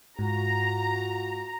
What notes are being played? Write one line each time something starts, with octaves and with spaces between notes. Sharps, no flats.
G#2 F4 F#4 A#5